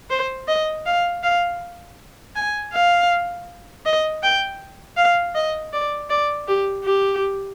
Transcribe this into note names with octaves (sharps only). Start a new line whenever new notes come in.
C5
D#5
F5
F5
G#5
F5
D#5
G5
F5
D#5
D5
D5
G4
G4